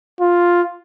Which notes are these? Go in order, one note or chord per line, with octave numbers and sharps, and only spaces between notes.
F4